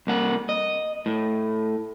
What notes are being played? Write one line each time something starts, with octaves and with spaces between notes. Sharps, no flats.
C2 A#3 F#5
D#5
A2